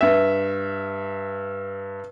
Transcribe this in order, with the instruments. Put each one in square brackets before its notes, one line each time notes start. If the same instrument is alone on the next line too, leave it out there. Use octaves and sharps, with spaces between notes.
[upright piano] G2 E5